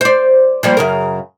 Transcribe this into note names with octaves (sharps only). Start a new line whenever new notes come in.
C5 D5
F3 G3 A#3
F#2 C#3 A#4